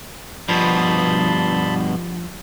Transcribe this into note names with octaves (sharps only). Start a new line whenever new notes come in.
G2 B2 F3 A5 B5 C6